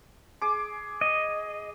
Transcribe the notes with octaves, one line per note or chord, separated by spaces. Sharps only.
G#4 D6
D#5